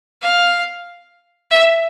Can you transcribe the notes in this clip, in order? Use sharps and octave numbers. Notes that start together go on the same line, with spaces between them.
F5
E5